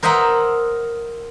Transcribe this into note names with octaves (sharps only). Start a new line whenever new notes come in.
A#4 C5 D#5 E5 F#5